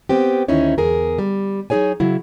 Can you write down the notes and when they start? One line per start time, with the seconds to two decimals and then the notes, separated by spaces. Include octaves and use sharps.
0.09 B3 C4 G4
0.48 D2 D#3 C#4 D#4 E4 C#5
0.78 E2 G#4 A#4
1.19 G3
1.70 F#3 D#4 G#4 C#5 G#5
2.00 C#3 F#3 E4